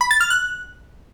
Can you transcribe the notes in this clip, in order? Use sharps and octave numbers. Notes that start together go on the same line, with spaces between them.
B5
A6
F6
F#6